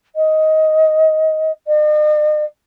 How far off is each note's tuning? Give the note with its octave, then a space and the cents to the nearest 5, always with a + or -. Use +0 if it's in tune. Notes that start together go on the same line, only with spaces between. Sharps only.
D#5 +15
D#5 -45